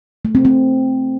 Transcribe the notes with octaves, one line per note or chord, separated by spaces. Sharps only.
A3
C4
C4